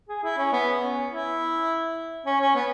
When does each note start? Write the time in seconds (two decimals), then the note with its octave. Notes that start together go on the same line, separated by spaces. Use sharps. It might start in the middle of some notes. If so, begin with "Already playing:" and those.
0.09 G#4
0.23 E4
0.37 C#4
0.52 B3
0.80 C#4
1.10 E4
2.26 C#4
2.41 C#4
2.55 B3